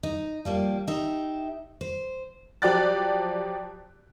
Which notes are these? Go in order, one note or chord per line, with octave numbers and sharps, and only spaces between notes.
D#4
F3 G3 A#3
D#4 G4 E5
C5
F3 F#3 G4 D5 F#6 A6